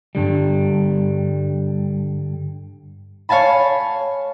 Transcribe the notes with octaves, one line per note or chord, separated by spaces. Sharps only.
G2 D3 G3
C#5 F5 G#5 A5 B5